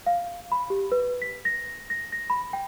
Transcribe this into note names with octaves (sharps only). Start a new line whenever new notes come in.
F5
B5
G4
B4
B6
A#6
A#6
A#6
B5
G5